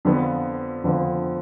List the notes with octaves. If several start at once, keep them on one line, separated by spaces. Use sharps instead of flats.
F2 D3 F3 B3
F2 D3 F3 B3